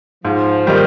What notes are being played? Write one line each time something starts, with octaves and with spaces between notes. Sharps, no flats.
G#2 F3
D#3 G3 A#3 D#4